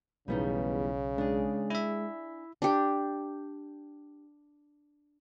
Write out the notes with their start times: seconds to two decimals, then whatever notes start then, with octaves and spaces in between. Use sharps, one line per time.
0.28 B1 E2 C#3 G3 B3 D#4
1.18 G#3 D4 G#4
1.70 E4 E5
2.62 D4 G4